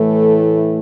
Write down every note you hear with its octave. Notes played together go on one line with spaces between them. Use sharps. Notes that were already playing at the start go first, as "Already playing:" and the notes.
Already playing: A2 E3 A3 A4